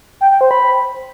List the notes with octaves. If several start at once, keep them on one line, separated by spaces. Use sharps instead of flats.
G5
G5
C5
B5